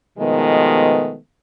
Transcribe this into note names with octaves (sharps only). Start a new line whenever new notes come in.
B2 D#3 F3 G#3 A3 B3